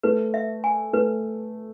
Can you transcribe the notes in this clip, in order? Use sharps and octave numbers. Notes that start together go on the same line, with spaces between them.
A3 B4
E5
G#5
A3 B4